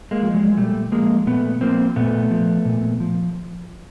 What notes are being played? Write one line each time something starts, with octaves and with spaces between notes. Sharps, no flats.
G#3 A#3
F3
F#3 G#3
A#2 G3 A3
F3 G#3 A#3
A#2 A3 B3
F3 A#3 C4
A#2 A3 B3
F3
A#2
F3